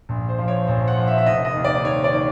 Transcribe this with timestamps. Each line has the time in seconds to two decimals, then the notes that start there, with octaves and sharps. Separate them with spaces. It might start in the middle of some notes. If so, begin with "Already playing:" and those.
0.09 A#1
0.29 C5
0.38 F3
0.48 C#5
0.67 A#1 C5
0.87 F#5
0.97 F3
1.07 E5
1.18 E5
1.26 F1 D#5
1.45 D#5
1.55 D#2
1.64 D5
1.84 D#3 C#5
2.04 D5
2.13 D#3